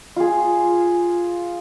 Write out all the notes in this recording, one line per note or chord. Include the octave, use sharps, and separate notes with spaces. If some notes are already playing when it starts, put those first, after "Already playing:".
F4 G#4